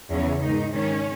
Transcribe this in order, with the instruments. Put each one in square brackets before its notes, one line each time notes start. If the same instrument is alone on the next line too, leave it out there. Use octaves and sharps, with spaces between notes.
[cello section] E2 C#3 E3 C#4
G#2 D#3 D#4
G#2 D#3 C#4